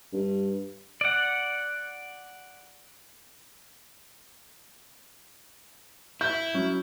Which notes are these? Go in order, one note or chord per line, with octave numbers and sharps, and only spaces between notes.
G2
D5 F#5
E4 G6
F#3 C#4